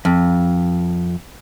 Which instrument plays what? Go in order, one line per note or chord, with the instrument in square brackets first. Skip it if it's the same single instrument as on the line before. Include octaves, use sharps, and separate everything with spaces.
[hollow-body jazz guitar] F2